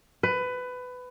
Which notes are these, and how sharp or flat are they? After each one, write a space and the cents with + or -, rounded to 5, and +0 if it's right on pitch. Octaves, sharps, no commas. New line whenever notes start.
B4 +20